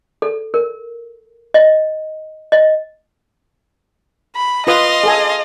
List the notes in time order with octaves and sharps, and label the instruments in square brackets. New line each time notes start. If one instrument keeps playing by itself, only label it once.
[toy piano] A4
A#4
D#5
D#5
[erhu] B5
[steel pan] F4 B4 D#6 [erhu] D#5 [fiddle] F5 C6
[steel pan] G#4 A4 G#5